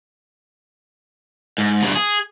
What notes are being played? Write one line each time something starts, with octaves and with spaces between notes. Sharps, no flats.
G#2
G2 B2
G#4